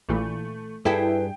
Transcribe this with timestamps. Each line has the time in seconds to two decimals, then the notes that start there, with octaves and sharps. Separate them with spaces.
0.09 A#1 A#2 E3 A3
0.85 G2 E4 G#4 A4 B4 G5